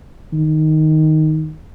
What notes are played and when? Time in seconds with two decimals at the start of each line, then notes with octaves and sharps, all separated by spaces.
0.33 D#3